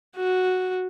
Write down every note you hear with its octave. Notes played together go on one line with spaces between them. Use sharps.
F#4